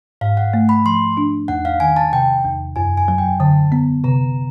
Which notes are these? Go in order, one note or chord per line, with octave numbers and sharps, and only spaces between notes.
G#2 F5
F#5
A3
B5
F3 C6
D4
E2 F#5
F5
D#3 G#5
A5
C3 G5
E2
F#2 G#5
G#5
F#3
G5
D3 A5
B3
C3 A#5